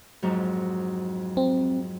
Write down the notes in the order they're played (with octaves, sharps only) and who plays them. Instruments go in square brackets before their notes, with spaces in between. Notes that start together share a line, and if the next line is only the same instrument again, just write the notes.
[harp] F2 G#2 F#3
[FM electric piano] C4